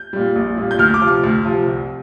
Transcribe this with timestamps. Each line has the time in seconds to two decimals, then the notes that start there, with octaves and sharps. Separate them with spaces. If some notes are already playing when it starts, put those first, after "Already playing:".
Already playing: G6
0.13 A#2 G3
0.36 A#1
0.57 A#2 G3
0.71 G6
0.79 D2 F6
0.94 D6
1.01 C3 F3
1.08 F6
1.24 D2
1.45 C3 F3
1.67 C2